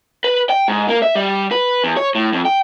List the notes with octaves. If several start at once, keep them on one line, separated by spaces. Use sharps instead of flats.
B4
G5
G#2
A#3
E5
G3
B4
E2
C#5
A2
F2
G5